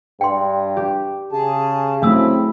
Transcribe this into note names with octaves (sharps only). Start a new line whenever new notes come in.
G2 G5 C6
G4
C#3 G#4 A5
F#3 A3 C4 E4 E5 D#6 E6